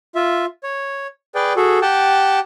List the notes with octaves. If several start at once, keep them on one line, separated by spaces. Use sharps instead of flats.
F4 E5
C#5
G#4 B4 D5 G5
F#4 G#4 A4
G4 F#5 G5 A5